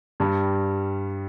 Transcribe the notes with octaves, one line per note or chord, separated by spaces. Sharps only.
G2 G3